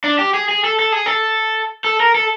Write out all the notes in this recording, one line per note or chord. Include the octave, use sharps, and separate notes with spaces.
D4
G4
G#4
G#4
A4
A4
G#4
A4
A4
A#4
A4